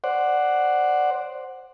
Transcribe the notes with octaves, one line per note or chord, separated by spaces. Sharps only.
C5 D5 F#5